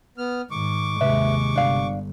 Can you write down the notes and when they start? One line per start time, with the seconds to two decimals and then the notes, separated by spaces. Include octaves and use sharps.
0.18 B3 F6
0.51 G#2 D#3 C#6 D6
1.01 D#2 C3 G#3 B4 E5
1.56 G1 D4 F5